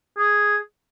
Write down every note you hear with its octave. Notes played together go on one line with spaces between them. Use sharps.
G#4